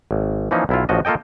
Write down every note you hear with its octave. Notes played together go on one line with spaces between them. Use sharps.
G#1
E3 F3 A#3 C#4 D#4
B1 E4 F4
A1 F3 F#4 D#5
A#3 F4 A4 D#5 G5